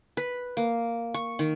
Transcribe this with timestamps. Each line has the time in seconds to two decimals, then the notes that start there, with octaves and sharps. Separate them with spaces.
0.17 B4
0.57 A#3
1.14 C#6
1.39 D#3